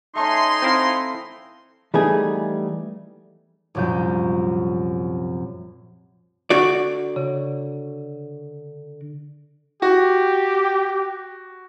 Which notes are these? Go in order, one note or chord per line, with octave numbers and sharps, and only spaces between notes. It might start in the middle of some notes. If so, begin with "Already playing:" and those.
A3 C#4 D#4 G#5 C6
C4 E4 C5 F5
E3 G3 A3 B3 D#4 G#4
C2 F#2 A#2 F3 G6
D3 F#4 D5 F#5 C#6
C#3
F#4 G4